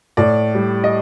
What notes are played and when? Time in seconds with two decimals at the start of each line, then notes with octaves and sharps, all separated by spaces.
0.17 A2 D5
0.55 G3
0.84 D#5